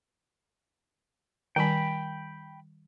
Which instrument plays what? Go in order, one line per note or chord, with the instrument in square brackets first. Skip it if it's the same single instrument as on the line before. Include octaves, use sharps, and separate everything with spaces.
[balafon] D#3 G3 G#5 [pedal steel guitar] G5 B5